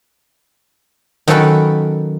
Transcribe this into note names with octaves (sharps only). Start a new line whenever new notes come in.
D#3 F#3 A#3 C#4 A4 B4